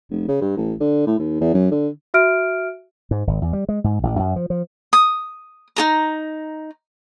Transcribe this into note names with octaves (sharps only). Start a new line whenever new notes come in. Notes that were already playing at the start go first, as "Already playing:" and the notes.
F1
C#3
G2
A1
D3
A2
D#2
E2
F#2
D3
F#4 E5 F6 D7
G#2
G#1
E2
G3
G#3
G#2
A1
F#2
F3
F3
D#6
D#4 A4 A#5